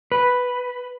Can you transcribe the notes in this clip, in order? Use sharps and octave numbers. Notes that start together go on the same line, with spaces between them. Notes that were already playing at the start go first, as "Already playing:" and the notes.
B4